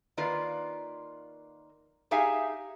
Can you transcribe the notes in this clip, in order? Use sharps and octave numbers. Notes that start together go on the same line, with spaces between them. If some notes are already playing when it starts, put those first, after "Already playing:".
D#3 A#3 F4 B4 D5
D#4 G4 G#4 E5 F5 G#5